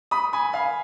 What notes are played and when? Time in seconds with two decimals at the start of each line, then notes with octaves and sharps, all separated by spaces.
0.11 B5 D#6
0.33 G#5 B5
0.53 F5 G#5